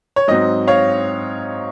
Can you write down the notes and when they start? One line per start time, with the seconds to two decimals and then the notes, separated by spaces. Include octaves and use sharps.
0.16 C#5
0.28 G#2 F#3 C4 D#5
0.67 C#5 F5